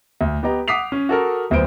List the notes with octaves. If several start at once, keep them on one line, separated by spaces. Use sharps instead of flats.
D2
B3 G4 D#5 A#5
F#5 D6 D#6 B6 C7 F7
C#4
F#4 A4 A#4
D1 D2 B3 C5 D7